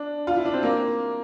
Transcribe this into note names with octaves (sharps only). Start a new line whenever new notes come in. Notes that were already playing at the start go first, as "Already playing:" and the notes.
Already playing: D4
F4
E4
D4
C4
A#3